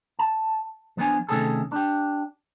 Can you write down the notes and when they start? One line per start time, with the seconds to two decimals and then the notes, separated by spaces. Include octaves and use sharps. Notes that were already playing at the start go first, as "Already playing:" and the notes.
0.19 A5
0.97 F3 B3 D4 G#5
1.29 C3 D#3 A3 C#4 G#4 A4
1.72 D4 G4